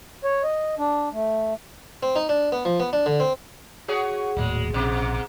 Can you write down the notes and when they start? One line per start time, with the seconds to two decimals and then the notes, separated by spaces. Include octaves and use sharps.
0.24 C#5
0.44 D#5
0.78 D4
1.13 A3
2.03 C4
2.16 D#4
2.29 D4
2.52 B3
2.65 F3
2.80 B3
2.93 D4
3.06 D3
3.20 C4
3.88 F#4 G#4 C#5
4.37 D#1 A2 F#3 G#3 A#3
4.74 A#1 G#2 B2